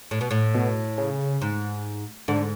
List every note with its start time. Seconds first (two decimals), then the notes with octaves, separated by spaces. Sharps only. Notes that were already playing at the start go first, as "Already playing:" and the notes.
0.11 A2
0.21 B2
0.31 A2
0.54 B2
0.98 C#3
1.41 G#2
2.28 G#2 D3